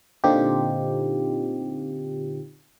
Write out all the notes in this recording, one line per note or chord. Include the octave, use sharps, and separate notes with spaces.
A#2 D3 C4 D#4 F4 G4